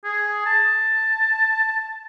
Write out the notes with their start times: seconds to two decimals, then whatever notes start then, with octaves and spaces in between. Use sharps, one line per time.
0.04 G#4
0.46 A5